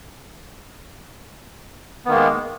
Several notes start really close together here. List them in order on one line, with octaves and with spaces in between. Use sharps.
B3 D#3 A#3 G#3